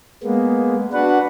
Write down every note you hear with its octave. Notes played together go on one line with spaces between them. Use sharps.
G#3 A#3 B3
D4 F#4 B4 F#5